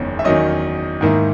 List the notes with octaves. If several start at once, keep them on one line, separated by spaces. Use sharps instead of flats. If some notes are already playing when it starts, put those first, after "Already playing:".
Already playing: F#1 E2 D#3 G#3 C#4
E5
E2 D#3 F#3 C#4 D#5
G#2 D#3 A#3 E4